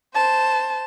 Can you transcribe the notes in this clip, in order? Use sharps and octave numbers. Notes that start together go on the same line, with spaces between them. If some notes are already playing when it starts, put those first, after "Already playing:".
C5 A5